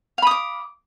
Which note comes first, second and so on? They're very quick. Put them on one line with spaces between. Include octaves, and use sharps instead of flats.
F5 B5 D#6 D6